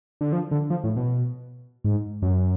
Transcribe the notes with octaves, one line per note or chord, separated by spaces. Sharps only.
D3
F3
D3
F3
A2
B2
G#2
F#2